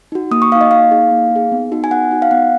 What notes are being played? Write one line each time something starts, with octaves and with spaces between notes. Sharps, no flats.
D#4 F#4
A#3 D#6
C#6
D#4 F#4 F5
D#5
A#3 F5
D#4 G#4
A#3
D#4 G#4
B3
D#4 F#4
G#5
B3 F#5
D#4 F#4
F5
B3 F#5